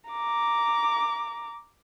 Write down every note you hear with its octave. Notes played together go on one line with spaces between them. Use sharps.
A#5 D6